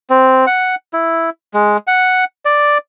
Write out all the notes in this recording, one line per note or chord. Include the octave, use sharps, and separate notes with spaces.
C4
F#5
E4
G#3
F#5
D5